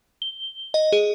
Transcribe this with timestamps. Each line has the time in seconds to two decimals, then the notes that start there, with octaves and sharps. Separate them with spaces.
0.22 G7
0.74 D#5
0.93 G#4